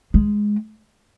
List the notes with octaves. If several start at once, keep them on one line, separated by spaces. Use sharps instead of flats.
G#3